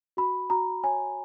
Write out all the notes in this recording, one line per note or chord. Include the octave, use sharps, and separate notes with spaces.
F#4 B5
F#4 A#5
C#5 G#5